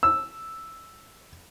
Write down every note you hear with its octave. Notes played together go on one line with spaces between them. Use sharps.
E6